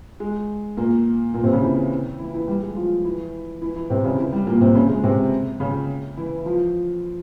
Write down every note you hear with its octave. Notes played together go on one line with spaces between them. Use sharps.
G#3
A#2 A#3
A#2 A#3
C3 C4
C#3 C#4
E3 E4
E3 E4
E3 E4
G3
G#3
F3 F4
E3 E4
E3 E4
E3 E4
C3 C4
C#3 C#4
E3 E4
G3
A#2 A#3
C3 C4
C#3 C#4
G#3
C3 C4
C#3 C#4
E3 E4
F3 F4